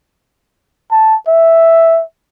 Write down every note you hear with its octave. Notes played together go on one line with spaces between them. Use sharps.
A5
E5